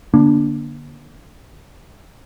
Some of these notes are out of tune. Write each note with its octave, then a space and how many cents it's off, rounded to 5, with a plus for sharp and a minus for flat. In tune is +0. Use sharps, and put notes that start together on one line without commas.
D3 +0 A#3 +30 D4 -5